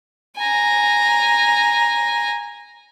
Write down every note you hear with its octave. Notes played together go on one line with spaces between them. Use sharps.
G#5 A#5